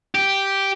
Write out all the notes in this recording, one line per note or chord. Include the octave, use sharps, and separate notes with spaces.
G4